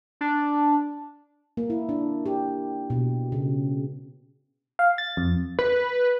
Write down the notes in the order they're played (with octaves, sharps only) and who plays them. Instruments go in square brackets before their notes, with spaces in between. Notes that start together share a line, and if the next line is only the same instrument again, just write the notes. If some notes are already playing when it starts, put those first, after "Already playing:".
[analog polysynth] D4
[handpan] A#3
E4
D4
G4
B2
C#3
[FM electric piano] F5
A6
F2
[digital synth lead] B4